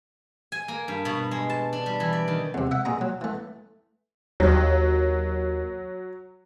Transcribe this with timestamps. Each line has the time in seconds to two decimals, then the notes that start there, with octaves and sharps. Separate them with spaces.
0.52 G#5
0.68 A#3
0.88 G2
1.05 B2
1.31 G#3
1.50 A5
1.73 D4
1.86 G3
2.00 E3
2.13 D5
2.28 D#3
2.54 E2 C3
2.71 E5 F#5
2.85 A#2 G#4 A#5
3.01 F#3
3.21 E3 A3
4.40 D#2 F#3